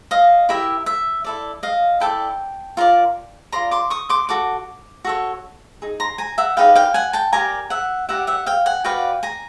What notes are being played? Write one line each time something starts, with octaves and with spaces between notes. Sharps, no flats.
D#5 F5
E4 G4 A#4 E5
E5
E4 A4 D5
D#5 F5
E4 A4 D5 G5 A5
F4 A#4 D5
F4 A#4 D5 A#5 C6
C6 D6
C#6 D#6
C6 D6
F#4 A4 D6
F#4 A4 C#5
D#4 G#4
A#5 C6
G#5 A#5
E5 F#5
D#4 G#4 B4 D5 F5 G5
F5 G5
F#5 G#5
G5 A5
G4 A#4 D5 G#5 A#5
E5 F#5
G4 A#4 D5 E5 F#5
E5 F#5
F5 G5
F#5 G#5
F#4 B4 D5 F5 G5
G#5 A#5